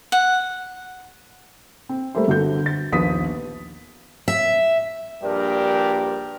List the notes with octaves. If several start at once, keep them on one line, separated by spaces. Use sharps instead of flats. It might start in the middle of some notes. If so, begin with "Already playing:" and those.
F#5
C4
G3 A3 A#3 G4 C5
G1 D3 F#4 A4 G6
A6
A#1 D#2 B3 B4 D#6 B6
E5
A#1 G2 G3 D4 G4 A#4